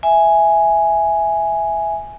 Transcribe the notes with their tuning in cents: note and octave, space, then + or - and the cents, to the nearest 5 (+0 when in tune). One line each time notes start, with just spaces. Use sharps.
E5 +0 G#5 +0